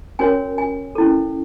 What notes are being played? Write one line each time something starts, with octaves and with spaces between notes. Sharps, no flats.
C#4 F#4 A#4 C#5 G#5
G#5
C#4 E4 A4